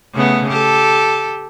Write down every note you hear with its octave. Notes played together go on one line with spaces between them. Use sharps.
C#3 A3 B3
G4 A4